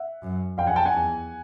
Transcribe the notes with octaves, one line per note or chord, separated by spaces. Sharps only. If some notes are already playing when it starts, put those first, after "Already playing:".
Already playing: E5 F#5
F#2
F2 F5 G5
F#5 G#5
G5 A5
F#5 G#5
E2